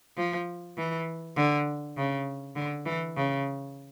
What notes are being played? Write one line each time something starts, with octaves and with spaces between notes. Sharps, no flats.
F3
E3
D3
C#3
D3
E3
C#3